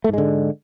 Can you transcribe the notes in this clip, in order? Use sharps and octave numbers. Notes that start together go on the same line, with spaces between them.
G#2 D3 G#3 A3